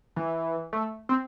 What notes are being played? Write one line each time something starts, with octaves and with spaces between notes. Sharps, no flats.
E3
A3
C4